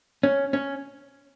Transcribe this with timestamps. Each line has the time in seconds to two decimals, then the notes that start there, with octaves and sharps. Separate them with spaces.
0.23 C#4 C#5
0.53 C#4